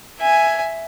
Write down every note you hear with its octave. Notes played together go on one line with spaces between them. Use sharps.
E5 G#5